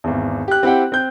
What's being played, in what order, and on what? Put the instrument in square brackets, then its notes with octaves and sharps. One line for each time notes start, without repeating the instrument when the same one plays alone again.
[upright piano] G#1 E2
G4 F#6
C4 E4 G4 F#5 G5
C4 G6